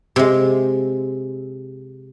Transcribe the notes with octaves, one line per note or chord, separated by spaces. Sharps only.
C3 G#3